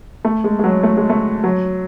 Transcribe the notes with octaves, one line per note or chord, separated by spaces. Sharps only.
A3
G#3
G#3
F#3
A3
G#3
A3
F#3